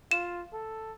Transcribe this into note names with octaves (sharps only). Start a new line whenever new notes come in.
F4 E7
A4